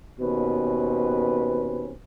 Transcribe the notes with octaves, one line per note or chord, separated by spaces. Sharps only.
D#2 B2 C4 C#4 B4